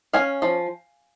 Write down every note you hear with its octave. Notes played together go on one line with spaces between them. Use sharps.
C#4 F5 G#5
F3